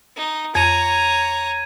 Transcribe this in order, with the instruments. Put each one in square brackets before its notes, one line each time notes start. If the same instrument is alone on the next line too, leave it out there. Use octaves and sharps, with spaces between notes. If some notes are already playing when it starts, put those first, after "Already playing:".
[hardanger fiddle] D#4
[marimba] F2 [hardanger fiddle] C#5 A#5 [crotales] G#6 D#7